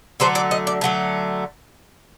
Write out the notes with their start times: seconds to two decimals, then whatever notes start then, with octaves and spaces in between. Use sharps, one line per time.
0.20 D3 F#3 A3 C5
0.35 D5
0.51 D#5
0.67 D5
0.81 D3 F#3 A3